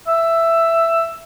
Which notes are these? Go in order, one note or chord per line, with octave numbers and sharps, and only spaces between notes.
E5